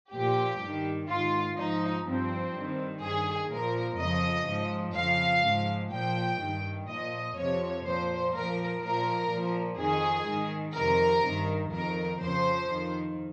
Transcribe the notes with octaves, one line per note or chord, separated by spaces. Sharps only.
A#2 F3 G4
G2 D#3
G#2 D#3 F4
G#2 F3 D#4
G2 F3 C4
G2 D#3
G2 D#3 G#4
A#2 F3 A#4
F2 C#3 F3 D#5
G#2 F3
F2 C#3 F3 F5
G#2 F3
A#2 F3 G5
G2 D#3
A#2 F3 D#5
F2 C3 F3 C#5
A#2 F3 C5
A#2 F3 A#4
A#2 F3 A#4
A#2 F3
F2 D#3 G#4
G#2 D#3
F2 C3 D#3 A#4
G2 D#3
F2 D#3 A#4
F2 C#3 F3 C5
F2 D#3